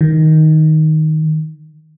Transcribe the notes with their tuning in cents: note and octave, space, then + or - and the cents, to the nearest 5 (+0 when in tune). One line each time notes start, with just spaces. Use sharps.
D#3 +5